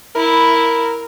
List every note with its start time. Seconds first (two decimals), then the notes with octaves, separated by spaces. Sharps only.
0.15 E4 A#4 B5